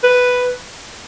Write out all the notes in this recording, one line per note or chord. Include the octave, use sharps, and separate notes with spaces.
B4